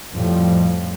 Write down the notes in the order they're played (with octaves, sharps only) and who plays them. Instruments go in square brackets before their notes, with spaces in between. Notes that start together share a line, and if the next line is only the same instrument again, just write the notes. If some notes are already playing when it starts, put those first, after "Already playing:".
[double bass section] F2 A2 F3 G3